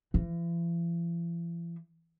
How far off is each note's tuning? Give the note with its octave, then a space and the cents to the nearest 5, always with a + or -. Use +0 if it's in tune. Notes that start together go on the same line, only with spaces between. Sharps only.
E3 +45